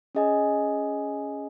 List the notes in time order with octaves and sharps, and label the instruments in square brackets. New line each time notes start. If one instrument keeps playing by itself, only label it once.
[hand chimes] C#4 G#4 D#5 G#5